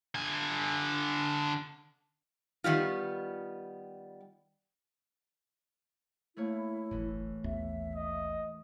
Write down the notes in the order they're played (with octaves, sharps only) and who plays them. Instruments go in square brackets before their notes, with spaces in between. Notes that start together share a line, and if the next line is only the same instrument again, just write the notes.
[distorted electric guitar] D3 G#5
[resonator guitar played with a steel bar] D#3 G3 B3 F4
[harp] A3 A#3 C#5 [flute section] E4
[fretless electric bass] D1 G1 A2 [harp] E3 C#4
[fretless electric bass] A1 D#2 B3 [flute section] E5
[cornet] D#5